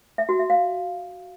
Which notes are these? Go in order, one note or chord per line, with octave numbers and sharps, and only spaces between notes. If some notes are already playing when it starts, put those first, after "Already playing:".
E5
F#4
E5
F5